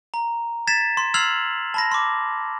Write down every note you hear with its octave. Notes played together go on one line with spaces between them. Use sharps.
A#5
G#6 A6 B6 E7
C6
E6 F6 G#6 C7 F7 F#7
A5 B5 A#6
C6 D6